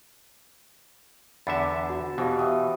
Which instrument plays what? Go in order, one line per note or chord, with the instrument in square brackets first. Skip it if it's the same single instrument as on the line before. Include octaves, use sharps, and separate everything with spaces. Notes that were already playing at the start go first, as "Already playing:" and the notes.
[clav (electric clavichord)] E2 D3 E5 [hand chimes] B5 A6
[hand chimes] F#4
[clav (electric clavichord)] B2 E3 [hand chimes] G4 C5 F5
[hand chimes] E5 G5 D#6